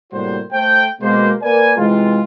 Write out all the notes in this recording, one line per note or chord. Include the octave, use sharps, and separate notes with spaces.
A2 C3 G3 A#3 F#4 C5
A3 C5 G5
B2 G#3 A#3 C5
A#3 A#4 B4 D5 G#5
C3 E3 G#3 C4 F4